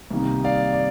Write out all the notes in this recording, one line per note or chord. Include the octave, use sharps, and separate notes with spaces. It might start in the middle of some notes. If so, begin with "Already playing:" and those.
C2 C3 D#3 A#3 D#4
D5 F5
D5